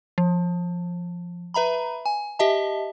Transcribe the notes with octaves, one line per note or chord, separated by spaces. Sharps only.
F3
B4 E5 A#5 B5
G#5
G4 D#5 E5 A5